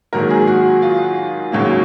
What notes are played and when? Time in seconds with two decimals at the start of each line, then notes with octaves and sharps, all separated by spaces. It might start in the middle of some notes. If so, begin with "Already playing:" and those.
0.13 G#2 D#3 F#3 A#3 A#4
0.30 G#4
0.47 F#4
0.82 F4
1.52 D#2 C#3 F#3 A#3